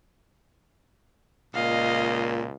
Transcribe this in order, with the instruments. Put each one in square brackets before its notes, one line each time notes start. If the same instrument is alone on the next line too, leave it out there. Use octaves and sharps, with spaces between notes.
[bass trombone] C#2 [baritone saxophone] A#2 [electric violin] D#5 F5